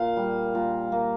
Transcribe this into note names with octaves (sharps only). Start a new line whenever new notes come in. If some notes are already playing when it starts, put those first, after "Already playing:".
Already playing: A#2 F5
G3
A#2
A#3